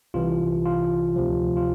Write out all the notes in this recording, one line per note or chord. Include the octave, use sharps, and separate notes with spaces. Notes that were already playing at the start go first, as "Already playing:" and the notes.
C2 C3 E3 F4
F4
D2 C3 F3
F4